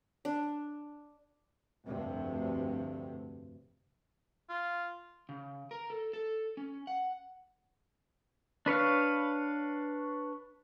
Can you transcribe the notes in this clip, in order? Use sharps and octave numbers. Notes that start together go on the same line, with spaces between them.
D4
F1 D2 G2 C3
F4
C#3
A#4
A4
A4
C#4
F#5
D4 B4 C#5 F5